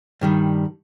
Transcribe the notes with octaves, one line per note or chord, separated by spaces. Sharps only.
G2 D#3 G3